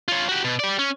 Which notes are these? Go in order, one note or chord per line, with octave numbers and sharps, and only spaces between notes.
F4 C#5
F#4 G4
B2
G4 D5
C#4